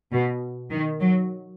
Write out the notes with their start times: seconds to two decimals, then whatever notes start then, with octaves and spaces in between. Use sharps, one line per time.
0.12 B2
0.70 D#3
1.00 F#3